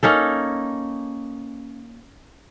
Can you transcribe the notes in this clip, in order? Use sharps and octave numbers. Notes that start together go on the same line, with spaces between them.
A#3 C#4 D#4 A4